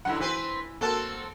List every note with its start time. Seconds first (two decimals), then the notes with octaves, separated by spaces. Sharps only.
0.05 F#2 D3 E4 F#5
0.20 E3 C4 B4 C5
0.81 A#3 C4 F#4 A4 A5